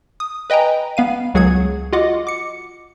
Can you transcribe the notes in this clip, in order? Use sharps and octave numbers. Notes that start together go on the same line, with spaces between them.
D#6
B4 D#5 G5 G#5 A#5
B3 F5 D#7
C#2 F#3 G#4 F#5 G#6
F4 F#4 D#5 F#5 D6
D6 C#7